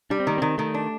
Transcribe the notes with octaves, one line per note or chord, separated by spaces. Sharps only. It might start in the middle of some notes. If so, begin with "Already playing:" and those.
G3 D4
C4
D#3 A#3
D#3 C4
D#3 A3
D4